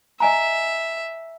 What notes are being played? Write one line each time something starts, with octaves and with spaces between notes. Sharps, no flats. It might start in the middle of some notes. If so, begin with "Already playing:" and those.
D#5 E5 G#5 A#5